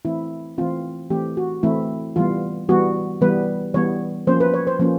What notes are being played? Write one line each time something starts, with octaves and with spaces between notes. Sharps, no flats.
E3 A3 C4 E4
E3 A3 C4 F4
E3 A3 C4 G4
F#4
E3 A3 C4 E4
E3 G3 B3 F4
E3 G3 B3 F#4
E3 G3 B3 B4
E3 G3 B3 C#5
F3 A#3 C#4 C5
B4
C#5
C5
F3 A#3 C#4